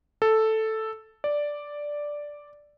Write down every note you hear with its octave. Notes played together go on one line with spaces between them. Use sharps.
A4
D5